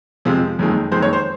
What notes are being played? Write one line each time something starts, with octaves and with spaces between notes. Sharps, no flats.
F2 C3 F3 G#3
F#1 F2 D#3 G#3
F#1 F2 D#3 G#3 C5
C#5
C5